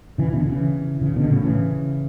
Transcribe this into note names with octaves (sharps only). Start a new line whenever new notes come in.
C#3 E3
B2 D3
C#3 E3
C#3 E3
B2 D3
A2 C#3
C#3 E3